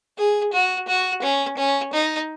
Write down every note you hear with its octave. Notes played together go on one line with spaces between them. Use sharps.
G#4
F#4
F#4
C#4
C#4
D#4